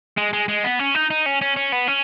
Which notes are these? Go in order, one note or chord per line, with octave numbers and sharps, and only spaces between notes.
G#3
G#3
G#3
B3
C#4
D#4
D#4
C#4
C#4
C#4
B3
C#4